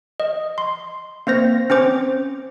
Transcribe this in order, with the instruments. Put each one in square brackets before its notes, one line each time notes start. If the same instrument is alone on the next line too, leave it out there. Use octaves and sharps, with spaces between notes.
[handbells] D#5
C6
A#3 C4 C5 A#6
C4 C#4 C5 D6